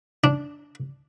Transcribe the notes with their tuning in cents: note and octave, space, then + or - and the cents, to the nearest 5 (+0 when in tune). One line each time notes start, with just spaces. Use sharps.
D4 -10